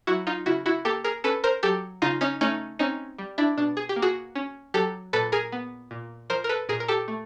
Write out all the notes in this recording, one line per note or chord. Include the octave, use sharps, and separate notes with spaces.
F#3 E4 F#4
D#4 F4
C#3 E4 F#4
E4 F#4
A#3 G4 A4
G#4 A#4
C#4 A4 B4
A#4 C5
F#3 G4 A4
C#3 D#4 F4
C#4 D#4
A3 C#4 D#4
C4 C#4 D#4
G3
D4 E4
B2 D4
G#4
G4
A#3
F#4 G#4
C#4
F#3 G4 A4
A#2 A4 B4
G#4 A#4
B3
A#2
F3 A#4 C5
A#4
A4 B4
A#2 G#4 A#4
A#4
G4 A4
A3